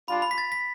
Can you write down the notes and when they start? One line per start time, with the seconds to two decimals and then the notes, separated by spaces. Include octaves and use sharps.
0.08 G3 D4 F4 B5
0.22 B5
0.31 B6
0.38 A6
0.52 B6